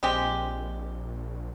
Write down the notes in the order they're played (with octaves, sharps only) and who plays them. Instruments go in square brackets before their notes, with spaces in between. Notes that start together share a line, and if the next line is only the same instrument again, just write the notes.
[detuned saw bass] A#1 [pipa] G#3 C4 G4